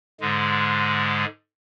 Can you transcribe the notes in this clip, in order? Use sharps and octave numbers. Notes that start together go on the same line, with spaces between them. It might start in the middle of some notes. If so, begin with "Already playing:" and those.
G#2 D3 G#3